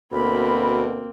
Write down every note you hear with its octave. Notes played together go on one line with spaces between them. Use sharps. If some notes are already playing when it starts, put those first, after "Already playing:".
D2 B2 A#3 C4 B5